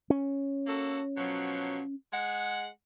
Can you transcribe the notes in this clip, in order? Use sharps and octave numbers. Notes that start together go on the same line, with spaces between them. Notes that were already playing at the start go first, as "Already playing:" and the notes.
C#4
A#3 F#4 A4
B2 F3 F#3
G#3 F#5